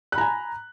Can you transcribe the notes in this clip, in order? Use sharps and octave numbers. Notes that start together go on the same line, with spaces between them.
G#5 A#5 B5 F#6